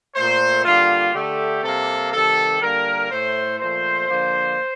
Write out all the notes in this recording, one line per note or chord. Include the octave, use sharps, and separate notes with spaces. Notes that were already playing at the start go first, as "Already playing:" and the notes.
A#2 A3 C5
D3 G3 A#3 F4
D3 A3 G4
C3 G3 A#3 A4
C3 D#3 G3 A4
D3 G3 A#3 A#4
A2 A3 C5
A#2 F3 A3 C5
D3 F3 A#3